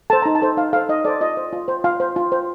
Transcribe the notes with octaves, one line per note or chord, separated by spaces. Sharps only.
A4 C5 A5
D#4 A#5
A5
A4 C5
D#4 F5
A4 C5 F5
D#4 D#5
A4 C5 D5
F4 D#5
C5
F4
C5
F4 F5
C5
F4
C5